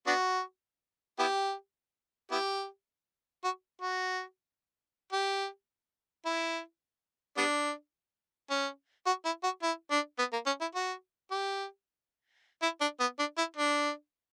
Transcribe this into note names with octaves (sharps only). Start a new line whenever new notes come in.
B3 D4 F#4
B3 E4 G4
B3 E4 G4
F#4
F#4
G4
E4
G3 B3 D4
C#4
F#4
E4
F#4
E4
D4
B3
A#3
C#4
E4
F#4
G4
E4
D4
B3
D4
E4
D4